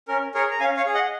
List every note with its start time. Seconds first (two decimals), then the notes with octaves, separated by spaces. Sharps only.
0.08 C#4 A#4
0.34 G#4 A#4 C#5
0.51 A#5
0.60 C#4 F5 G#5
0.77 C#5 F5
0.86 G#4
0.94 D#5 F#5